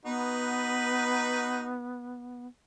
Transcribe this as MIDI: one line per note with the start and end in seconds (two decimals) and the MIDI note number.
0.05 2.47 59
0.05 1.79 63
0.05 1.79 66
0.05 1.79 71